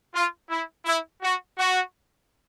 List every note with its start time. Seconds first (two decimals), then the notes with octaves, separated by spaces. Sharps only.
0.13 F4
0.49 E4
0.85 E4
1.22 F#4
1.58 F#4